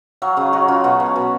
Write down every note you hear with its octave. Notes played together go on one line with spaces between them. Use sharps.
F#3 F5
C#3 D#5
F#3 F#4
C#3 F4
B2 F#4
B2
B2